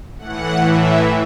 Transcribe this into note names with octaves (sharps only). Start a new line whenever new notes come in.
A2 E3 F#5
E5